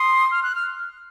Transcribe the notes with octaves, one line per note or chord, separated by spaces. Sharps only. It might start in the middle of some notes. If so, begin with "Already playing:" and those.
Already playing: C6 D#6
F6
F#6
F6